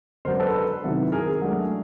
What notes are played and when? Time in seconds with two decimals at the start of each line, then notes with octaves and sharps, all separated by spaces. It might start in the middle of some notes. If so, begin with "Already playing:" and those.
0.25 D3 F#3 B3 D4 A#4 C5
0.40 A4 B4
0.84 C3 D#3 F#3 B3 E4
1.12 G#4 A#4
1.42 F#3 A3 D4